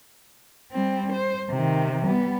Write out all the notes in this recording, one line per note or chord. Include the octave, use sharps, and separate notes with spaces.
G3 C4
C5
C3 D#3
G3 B3